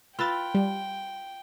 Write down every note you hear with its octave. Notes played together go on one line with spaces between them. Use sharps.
F4 B4 G5 E6 A6
G3